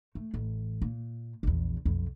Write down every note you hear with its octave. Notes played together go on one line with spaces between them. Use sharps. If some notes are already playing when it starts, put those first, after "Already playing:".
A3
A1
A#2
A#1 E2
B1 F2